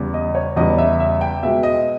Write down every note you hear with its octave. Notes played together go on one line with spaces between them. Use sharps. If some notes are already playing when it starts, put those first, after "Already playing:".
Already playing: E2 C#3 G3
D#5
C#5
E2 C#3 G3 D#5
E5
E5
G5
B2 G#3 E5
D#5